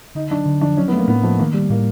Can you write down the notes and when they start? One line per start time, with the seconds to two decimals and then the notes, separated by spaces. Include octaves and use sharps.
0.15 D3 D#4
0.31 F#3 D4
0.46 D3
0.61 F3 D4
0.77 F#3 C#4
0.88 B3
0.93 A3 A#3
1.08 A2 B3
1.23 F3 A3
1.39 D#3 A#3
1.54 G3
1.70 A2 A#3